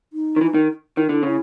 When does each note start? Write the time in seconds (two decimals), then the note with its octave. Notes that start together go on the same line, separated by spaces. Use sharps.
0.13 D#4
0.36 D#3
0.41 E3
0.54 D#3
0.97 D#3 E4
1.05 D#4
1.09 D3 E4
1.23 C#3 E4